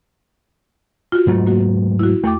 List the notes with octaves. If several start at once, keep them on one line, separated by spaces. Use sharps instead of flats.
F4 F#4
G#2 F#3 A3
A#3 F#4
E4 F#4
E2 A3 G5 D6